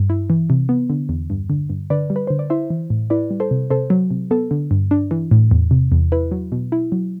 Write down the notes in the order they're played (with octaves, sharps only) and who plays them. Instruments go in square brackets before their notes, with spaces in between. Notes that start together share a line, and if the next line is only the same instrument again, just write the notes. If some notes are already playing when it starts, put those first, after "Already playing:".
Already playing: [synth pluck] G2
E4
E3
C3
B3
D3
E2
G2
D3
G2
D3 B4 D5
G3
B4
D3 C5
D5
E4 C5 E5
E3
A2
E4 B4 D5
G3
A4 C5
C3
C3 A4 C5
F#3
C3
B3 A4
D3
G2
D4
E3
A2
E2
C3
E2
E4 B4
F#3
B2
E4
F#3